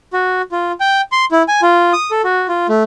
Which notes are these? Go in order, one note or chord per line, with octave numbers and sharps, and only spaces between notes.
F#4
F4
G5
C6
E4
G#5
F4
D#6
A4
F#4
F4
A3